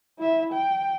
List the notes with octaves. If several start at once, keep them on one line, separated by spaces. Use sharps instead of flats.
E4 E5
G5